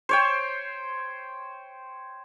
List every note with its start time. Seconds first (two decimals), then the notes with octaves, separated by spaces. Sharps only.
0.09 C5 C#5 G5